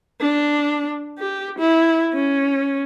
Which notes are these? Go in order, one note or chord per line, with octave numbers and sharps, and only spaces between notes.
D4
G4
E4
C#4